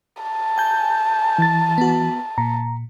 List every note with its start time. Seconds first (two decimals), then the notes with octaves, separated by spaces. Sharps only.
0.23 A5
0.58 G#5 G6
1.38 E3 A6
1.78 B3 F#4
2.38 A#2 A#5